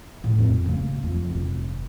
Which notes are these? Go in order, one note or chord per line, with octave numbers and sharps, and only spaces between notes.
A2
F2
C#3 A#3
F2
F1 G2